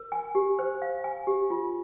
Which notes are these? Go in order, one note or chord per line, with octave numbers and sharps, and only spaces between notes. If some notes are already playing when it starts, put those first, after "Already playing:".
Already playing: A#4
G#5
G4
C5
F5
G#5
G4
F4